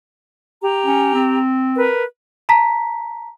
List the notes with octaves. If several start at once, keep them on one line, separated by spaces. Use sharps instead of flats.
G4 A#5
C#4
C4
A#4 B4
A5 A#5 B6